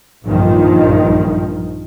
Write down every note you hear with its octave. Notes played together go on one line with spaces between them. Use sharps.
A#1 G2 D#3 F3